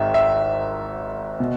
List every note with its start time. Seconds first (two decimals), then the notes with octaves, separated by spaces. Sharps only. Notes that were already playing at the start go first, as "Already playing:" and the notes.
Already playing: G#1 G#2 D#3 E5
0.14 E5
1.40 B2